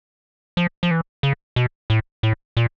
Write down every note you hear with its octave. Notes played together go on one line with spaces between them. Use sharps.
F3
F3
E3
C#3
B2
A2
A2
A#2